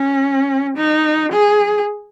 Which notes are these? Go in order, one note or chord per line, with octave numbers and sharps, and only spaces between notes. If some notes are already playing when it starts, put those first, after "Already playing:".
Already playing: C#4
D#4
G#4